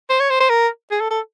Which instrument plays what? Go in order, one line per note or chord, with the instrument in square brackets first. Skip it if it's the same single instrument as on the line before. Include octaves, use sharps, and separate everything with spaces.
[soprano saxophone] C5
C#5
C5
C5
A#4
G#4
A4
A4